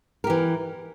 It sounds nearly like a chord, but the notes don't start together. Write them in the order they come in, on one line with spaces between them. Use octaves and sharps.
A#4 G4 E3